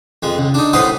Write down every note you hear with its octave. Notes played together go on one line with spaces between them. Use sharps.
F2 G#3
C#2
D4 D#4
F#2 A2 B4 C5 F#5 D#6